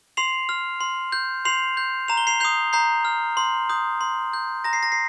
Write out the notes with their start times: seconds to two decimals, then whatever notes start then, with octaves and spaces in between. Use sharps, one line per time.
0.17 C6 C7 F7
0.49 F6
0.81 C6
1.12 G6
1.45 C6 C7 F7
1.77 G6
2.08 A#5 F7
2.17 G7
2.27 C7 F7
2.40 D#6 G6 C7 F7
2.73 A#5 G6 C7
3.05 F6
3.37 C6
3.70 D#6 G6
4.01 C6
4.33 G6
4.64 A#5 A#6
4.73 C7
4.83 A#6
4.92 C7